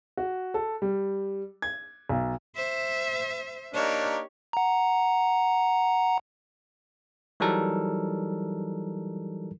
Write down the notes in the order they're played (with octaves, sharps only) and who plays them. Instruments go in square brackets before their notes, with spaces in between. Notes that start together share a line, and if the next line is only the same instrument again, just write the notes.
[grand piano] F#4
A4
G3
G#6
B1
[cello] C5 E5
[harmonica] A#3 D4 D#4 [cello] G4 C#5
[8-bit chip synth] F#5 A#5
[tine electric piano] E3 F#3 G3 D#4 A4 A#4